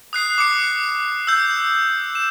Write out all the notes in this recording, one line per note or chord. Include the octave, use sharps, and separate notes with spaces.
D#6 F#6 C7
D6 C#7
E6 G6
E7